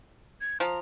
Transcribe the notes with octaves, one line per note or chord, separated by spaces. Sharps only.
G#6
F3 A#5